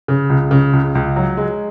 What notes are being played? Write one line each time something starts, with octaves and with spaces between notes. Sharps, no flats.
C#3
C#2
C#3
C#2
C#2
F#3
G#3